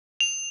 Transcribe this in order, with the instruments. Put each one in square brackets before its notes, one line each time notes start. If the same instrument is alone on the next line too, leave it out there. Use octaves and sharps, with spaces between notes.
[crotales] F7